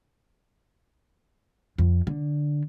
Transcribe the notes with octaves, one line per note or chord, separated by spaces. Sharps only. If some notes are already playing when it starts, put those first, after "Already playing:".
F2
D3